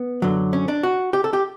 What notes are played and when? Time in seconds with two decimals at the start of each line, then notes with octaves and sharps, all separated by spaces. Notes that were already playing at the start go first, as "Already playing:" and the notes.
Already playing: B3
0.22 F#2 D3 F#3
0.53 C#4
0.68 D4
0.83 F#4
1.13 G4
1.24 A4
1.33 G4